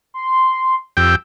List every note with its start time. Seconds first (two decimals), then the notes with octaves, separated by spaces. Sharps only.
0.14 C6
0.97 F2 G4 G5 E6